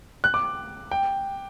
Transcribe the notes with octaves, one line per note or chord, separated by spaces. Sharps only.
F#6
D6
G5